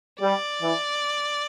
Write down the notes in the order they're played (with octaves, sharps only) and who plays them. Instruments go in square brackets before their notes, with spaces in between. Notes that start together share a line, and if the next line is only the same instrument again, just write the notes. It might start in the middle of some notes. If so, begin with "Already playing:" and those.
[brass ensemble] G3 [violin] D5
[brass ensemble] E3